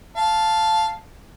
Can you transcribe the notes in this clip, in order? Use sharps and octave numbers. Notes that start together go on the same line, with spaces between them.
F5 A5